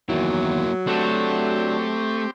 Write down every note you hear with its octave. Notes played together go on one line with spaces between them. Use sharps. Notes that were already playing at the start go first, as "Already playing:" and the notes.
E2 D#3 F#3 A#3 E4
A3 C4 D4 F#4 G4 A4